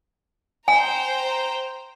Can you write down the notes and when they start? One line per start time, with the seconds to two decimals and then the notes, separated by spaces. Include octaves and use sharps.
0.68 C5 G5 G#5 A#5